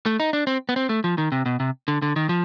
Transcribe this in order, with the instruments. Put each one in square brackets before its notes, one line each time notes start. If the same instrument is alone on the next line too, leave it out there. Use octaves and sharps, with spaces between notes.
[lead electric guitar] A3
D#4
D4
C4
B3
C4
A3
F3
D#3
C3
B2
C3
D3
D3
D#3
F3